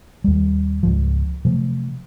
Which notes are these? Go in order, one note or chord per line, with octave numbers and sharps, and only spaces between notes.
D#2 G3
C#2 G#2 F3
C3 F3 F#3 A3